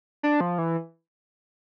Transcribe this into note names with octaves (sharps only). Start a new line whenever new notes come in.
D4
F3
E3